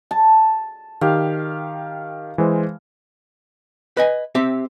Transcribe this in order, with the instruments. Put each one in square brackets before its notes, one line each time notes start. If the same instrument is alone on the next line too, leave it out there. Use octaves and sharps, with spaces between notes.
[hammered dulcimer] A5
[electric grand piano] D#3 G4 [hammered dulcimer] F5
[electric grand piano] E3 G#3 C5
[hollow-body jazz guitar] B4 D#5 G#5
C4 G4 E5